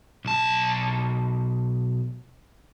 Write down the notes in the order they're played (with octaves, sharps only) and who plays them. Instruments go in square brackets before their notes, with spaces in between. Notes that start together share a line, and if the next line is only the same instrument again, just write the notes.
[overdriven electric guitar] B1 A5